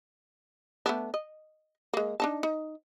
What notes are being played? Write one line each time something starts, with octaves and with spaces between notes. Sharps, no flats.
A3 B3 D4
D#5
G#3 A#3
D4 D#4 A5
D#4